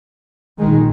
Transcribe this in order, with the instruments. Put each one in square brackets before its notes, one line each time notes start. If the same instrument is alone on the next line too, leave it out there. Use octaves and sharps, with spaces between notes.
[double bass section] A#1 D#3 G#3